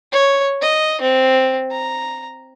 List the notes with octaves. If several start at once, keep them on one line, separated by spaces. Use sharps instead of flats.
C#5
D#5
C4
A#5